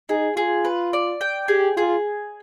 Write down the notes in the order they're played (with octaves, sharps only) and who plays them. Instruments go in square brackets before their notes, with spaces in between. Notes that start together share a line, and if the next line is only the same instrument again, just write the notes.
[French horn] D#4 [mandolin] G#4
[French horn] F4 [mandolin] G#4
[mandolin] B4
D5
G5
[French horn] G4 [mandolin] G#4
[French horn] F4 [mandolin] G#4